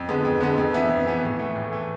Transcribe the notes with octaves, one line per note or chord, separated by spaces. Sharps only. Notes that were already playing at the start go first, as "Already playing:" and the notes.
Already playing: F2
D3 G#3 B3
F2
D3 G#3 B3
F2
E3 B3 E4
F2
E3 B3 E4
A2
E3 A3
A2
E3 A3